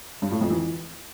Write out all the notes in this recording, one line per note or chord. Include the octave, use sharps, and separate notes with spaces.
G2
A2
F2
E3